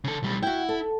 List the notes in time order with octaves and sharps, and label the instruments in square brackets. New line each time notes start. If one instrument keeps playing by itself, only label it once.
[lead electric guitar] C#3 A4
B1 G3
[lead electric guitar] E4 [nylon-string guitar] F#4 G5
[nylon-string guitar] A4